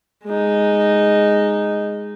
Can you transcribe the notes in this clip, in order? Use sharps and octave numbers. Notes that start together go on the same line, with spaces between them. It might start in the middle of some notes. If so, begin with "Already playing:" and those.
G#3 D#4